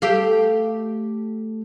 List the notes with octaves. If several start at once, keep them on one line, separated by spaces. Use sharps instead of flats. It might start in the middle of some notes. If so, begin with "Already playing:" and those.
A3 G4 F5